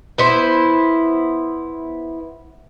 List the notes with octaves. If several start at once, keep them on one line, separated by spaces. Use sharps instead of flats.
B3 E4 C5